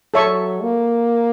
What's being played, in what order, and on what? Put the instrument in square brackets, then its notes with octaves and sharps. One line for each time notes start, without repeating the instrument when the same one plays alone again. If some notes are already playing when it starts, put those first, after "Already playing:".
[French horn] F#3 [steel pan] A4 C#5 E5 A5 C#6
[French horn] A#3